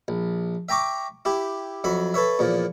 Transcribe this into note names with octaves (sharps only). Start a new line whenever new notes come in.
A#1
E5 G5 A#5 C#6 D6
E4 G4
F2 F#3 E5 B5
A4 B4 C#5 E5
E2 A#2 F3